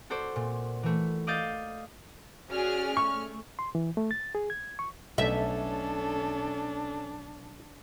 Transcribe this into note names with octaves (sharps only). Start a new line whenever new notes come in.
F#4 A4 C5 D5
A#2
E3 A3
D5 D#5 F5 G6 A6
C#4 F#4 G#4 D5 F6
A3 C#6
C6
E3
A3
A6
G#4
G#6
C#6
B1 A3 C#4 D4 A4 E5